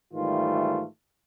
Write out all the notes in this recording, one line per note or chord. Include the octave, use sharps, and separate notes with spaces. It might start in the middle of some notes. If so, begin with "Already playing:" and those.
G#2 D#3 E3 G3 A3 F4